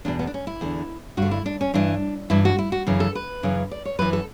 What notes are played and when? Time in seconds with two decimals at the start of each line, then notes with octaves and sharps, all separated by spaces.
0.05 E2 B2 D4
0.19 B3
0.27 D4
0.34 C#4
0.47 E4
0.61 E2 D3
1.17 G2 D3 F#4
1.31 E4
1.46 D4
1.61 C#4
1.74 G2 E3 D4
2.30 G2 E3 E4
2.45 F#4
2.58 E4
2.72 F#4
2.87 F#2 C#3 E3
3.00 A4
3.15 B4
3.43 F#2 C#3 E3
3.71 D5
3.85 C#5
3.99 F#2 E3 B4
4.13 A4